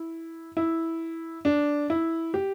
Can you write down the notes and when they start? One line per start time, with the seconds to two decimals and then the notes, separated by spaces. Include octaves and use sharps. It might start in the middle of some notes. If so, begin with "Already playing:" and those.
Already playing: E4
0.57 E4
1.45 D4
1.90 E4
2.34 G4